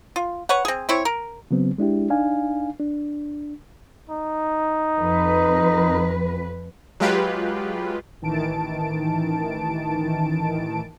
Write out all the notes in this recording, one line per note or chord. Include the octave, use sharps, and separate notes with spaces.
F4
B4 C#5 F#5
C4 G#4
C4 E4 C#5
A#4
C#3 F#3 B3 C4
G#3 D4 E4 G4
D4 D#4 F5 G#5
D4
D#4
F2 B4
F#3 G#3 F4 G4 B4
A1 D#3 E3 A5 D7